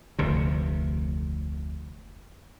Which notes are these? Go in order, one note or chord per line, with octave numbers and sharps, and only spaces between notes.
F1 D2 C3